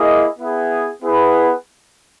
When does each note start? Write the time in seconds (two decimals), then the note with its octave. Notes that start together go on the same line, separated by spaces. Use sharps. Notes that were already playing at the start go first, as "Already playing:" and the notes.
Already playing: A#3 E4 G#4 D#5
0.39 B3 E4 G#4
1.02 B3 E4 G#4 B4 F#5